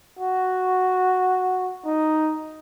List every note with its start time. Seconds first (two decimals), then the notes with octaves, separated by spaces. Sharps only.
0.19 F#4
1.85 D#4